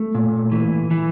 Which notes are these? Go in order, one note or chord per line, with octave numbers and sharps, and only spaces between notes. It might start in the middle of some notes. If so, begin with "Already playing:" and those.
Already playing: A3
A#2
E3
E3